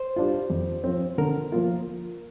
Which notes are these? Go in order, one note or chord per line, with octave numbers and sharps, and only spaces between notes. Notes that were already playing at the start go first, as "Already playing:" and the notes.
Already playing: C5
G3 D4 F4
F2
F3 C4
D3 A#4
F3 A#3 F4